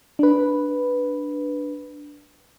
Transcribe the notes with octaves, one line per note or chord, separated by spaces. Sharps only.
D4 B4